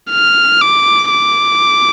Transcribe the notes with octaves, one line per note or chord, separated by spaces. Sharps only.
F6
D6
D6